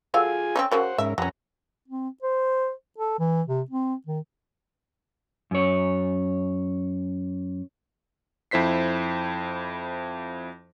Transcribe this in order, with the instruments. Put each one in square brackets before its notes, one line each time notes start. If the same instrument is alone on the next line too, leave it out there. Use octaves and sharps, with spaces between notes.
[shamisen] F#3 A4 F5 [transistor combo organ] F4 G#4 G#5
[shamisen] C4 C#4 D#4
[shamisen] C#3 F#4 A#4 [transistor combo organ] C5 F#5
[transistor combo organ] G#2 C#4 A#4 [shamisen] E5
[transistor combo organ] F2 F#5 A#5 [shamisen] G3 C#4
[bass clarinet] C4
C5
A4
E3
C3
C4
D#3
[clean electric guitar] F#2 C#5
[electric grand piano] F2 E4 C5 B6 C7